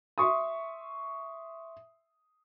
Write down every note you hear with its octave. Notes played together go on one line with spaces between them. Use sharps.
E5 C6 C#6 D#6